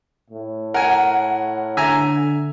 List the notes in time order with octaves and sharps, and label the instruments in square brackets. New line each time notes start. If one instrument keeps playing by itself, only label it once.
[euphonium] A2
[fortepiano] A#4 G#5 [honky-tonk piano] F#5
[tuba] D3 [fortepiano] E5 G#5 A#5